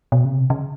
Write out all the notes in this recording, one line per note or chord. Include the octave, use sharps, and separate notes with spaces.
B2
C#3
C3
C#3